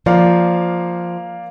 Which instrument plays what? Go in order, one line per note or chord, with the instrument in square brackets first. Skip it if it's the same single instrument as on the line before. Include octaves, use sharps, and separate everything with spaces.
[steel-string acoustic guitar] F3 [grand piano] A#3 D5 F5